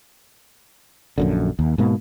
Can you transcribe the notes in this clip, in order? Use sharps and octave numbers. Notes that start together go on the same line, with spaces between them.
A#1 F#2 D3
D#2
G#2 B2 A#3